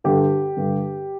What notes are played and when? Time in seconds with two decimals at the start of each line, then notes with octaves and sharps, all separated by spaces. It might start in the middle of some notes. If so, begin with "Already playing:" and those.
0.04 G2 D3 G4
0.57 G2 D3